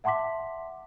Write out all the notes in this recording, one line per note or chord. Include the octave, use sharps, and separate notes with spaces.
E5 F#5 A5 C6 D6 B6